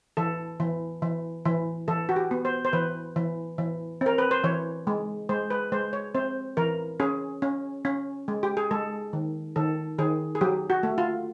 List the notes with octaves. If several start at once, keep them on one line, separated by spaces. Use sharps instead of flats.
E3 A4
E3
E3
E3
E3 A4
F#4
G4
B3
C5
C5
E3 B4
E3
E3
C4 A#4
B4
C5
E3 C#5
G#3
G#3 C5
B4
G#3 C5
C#5
C4 C5
E3 A#4
C#4 G#4
C#4
C#4
G#3
G4
G#4
G#3 A4
D#3
D#3 A4
D#3 G#4
G#4
F#3 G4
F#4
A3
F4